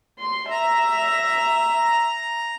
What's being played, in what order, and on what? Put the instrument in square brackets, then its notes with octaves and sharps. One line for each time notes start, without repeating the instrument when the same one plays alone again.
[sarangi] C6
[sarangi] E5 [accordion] A#5